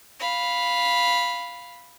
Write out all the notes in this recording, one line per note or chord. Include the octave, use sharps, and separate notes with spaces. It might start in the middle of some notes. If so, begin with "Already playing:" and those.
F5 B5